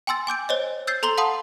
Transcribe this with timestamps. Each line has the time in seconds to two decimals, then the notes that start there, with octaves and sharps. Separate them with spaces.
0.07 G5 G#5 C6 E6 A6
0.27 G#5 D6 G6 D7
0.49 C5 C#5 D#5
0.87 E6 G6 A6 C7
1.03 A4 A#5 C6 F#7 G7
1.17 F5 F#5 A5 B5 C6 D#6